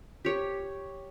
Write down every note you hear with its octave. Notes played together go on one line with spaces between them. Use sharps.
G4 C#5